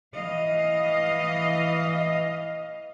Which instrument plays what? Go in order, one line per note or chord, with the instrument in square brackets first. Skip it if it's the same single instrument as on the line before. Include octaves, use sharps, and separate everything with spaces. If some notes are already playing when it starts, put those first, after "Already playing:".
[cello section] E3 D#5 F5